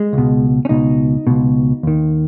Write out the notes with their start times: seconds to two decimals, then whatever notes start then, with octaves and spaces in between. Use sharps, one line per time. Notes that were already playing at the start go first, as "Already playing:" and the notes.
Already playing: G#3
0.13 C#2 B2
0.65 C#4
0.69 C#2 B2 D#4
1.27 C#2 B2
1.83 D#2 D#3